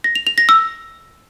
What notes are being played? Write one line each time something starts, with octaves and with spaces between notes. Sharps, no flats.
A#6
F7
F7
A#6
E6